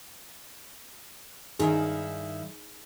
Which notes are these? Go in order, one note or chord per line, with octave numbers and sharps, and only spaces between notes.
G2 D#3 D#4 E4 G#4